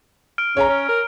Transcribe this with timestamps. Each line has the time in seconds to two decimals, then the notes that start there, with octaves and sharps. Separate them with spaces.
0.38 F6 D7
0.57 C#3 C#5 G#5 A#5
0.69 C#4
0.89 A#4